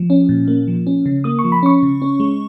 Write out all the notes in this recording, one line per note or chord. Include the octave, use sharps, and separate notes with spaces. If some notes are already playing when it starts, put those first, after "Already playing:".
Already playing: F3
C#4
A#2
A#3
F3
C#4
C#3
A#3 D#6
C#6
F3
B5
C#4 C#6
C#3
C#4
G#3